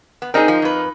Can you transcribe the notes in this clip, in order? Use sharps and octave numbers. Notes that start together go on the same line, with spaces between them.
B3
C4 D#4 G#4 A#4
F3
F2 B4